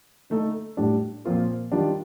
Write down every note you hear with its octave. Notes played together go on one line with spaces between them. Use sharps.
D3 A3 D#4 A4
A2 G3 D4
A#2 F3 C4 F4 A#4
D#3 G3 D4 F4